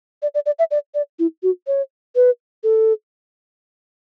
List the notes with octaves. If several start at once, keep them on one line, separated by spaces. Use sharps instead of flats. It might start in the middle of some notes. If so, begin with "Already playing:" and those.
D5
D5
D5
E5
D5
D5
E4
F#4
C#5
B4
A4